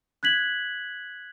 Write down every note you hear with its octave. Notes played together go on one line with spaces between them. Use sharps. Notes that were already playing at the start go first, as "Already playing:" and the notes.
F#6 G#6 B6 F#7